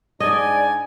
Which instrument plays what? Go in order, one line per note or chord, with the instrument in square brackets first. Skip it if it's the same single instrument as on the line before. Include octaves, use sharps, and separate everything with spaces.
[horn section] G#2 D4 G#5 [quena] D5 [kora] D#5